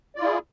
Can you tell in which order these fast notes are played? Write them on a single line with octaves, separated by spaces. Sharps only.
D5 F4 E4 G#4